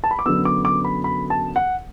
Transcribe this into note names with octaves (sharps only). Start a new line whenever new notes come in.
A5
B5
D6
F#2 D3 F#3 B3 E6
D6
D6
B5
B5
A5
F#5